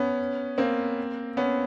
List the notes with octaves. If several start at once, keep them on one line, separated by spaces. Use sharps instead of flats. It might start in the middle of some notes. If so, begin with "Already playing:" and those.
Already playing: B3 C#4
A#3 C4
B3 C#4